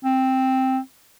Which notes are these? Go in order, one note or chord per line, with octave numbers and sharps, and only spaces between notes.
C4